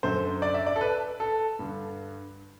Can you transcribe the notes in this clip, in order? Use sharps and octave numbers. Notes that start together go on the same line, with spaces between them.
F#2 D3 C5
D5
E5
D5
A4
B4
A4
G2 D3